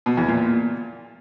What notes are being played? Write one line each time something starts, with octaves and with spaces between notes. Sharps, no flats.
B2
E2
A#2